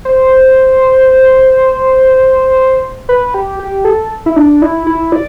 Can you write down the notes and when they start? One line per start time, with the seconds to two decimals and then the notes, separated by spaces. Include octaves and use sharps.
0.05 C5
3.09 B4
3.34 G4
3.59 G4
3.85 A4
4.26 E4
4.36 D4
4.62 E4
4.87 E4
5.12 D5